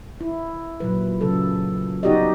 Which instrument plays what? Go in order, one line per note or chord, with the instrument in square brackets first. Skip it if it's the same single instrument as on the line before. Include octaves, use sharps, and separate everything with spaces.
[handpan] E4
A#2 F#3 B4
C#3 F#3 A4
B3 D#4 F#4 G4 D5 D#5